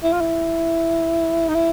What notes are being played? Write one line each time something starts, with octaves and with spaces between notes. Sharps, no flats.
E4
F4
E4
D#4
E4